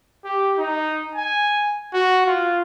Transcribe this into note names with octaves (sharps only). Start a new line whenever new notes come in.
G4
D#4
G#5
F#4
F4